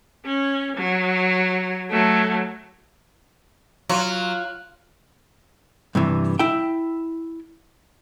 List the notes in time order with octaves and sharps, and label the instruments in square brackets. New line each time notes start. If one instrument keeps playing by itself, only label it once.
[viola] C#4
F#3
F#3 A3
[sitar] F#3 [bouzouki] F4
[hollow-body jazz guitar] G2 C3 E3
E4 G5